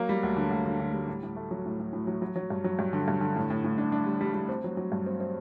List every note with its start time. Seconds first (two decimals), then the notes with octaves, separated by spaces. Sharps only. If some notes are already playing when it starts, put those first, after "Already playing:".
Already playing: F#3 A#3
0.09 G3
0.23 D2
0.37 D3
0.51 D2
0.66 D3
0.80 D3
0.93 G3
1.08 A2
1.23 A2
1.36 A3
1.51 F#3
1.66 A2
1.79 A2
1.93 A2
2.07 F#3
2.22 F#3
2.36 F#3
2.50 G2
2.64 F#3
2.79 G2
2.93 D3
3.08 G2
3.21 D3
3.36 A2
3.50 A2
3.64 A2
3.78 D4
3.92 D4
4.06 G3
4.21 G3
4.35 G3
4.49 C4
4.64 F#3
4.77 F#3
4.92 G2
5.06 C4
5.20 C4